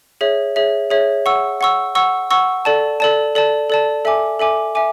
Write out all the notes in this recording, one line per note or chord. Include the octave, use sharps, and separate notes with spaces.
G#4 C#5 E5
G#4 C#5 E5
G#4 C#5 E5
F#5 C#6 E6
F#5 C#6 E6
F#5 C#6 E6
F#5 C#6 E6
A4 D5 A5
A4 D5 A5
A4 D5 A5
A4 D5 A5
A4 E5 G#5 D6
A4 E5 G#5 D6
E5 G#5 D6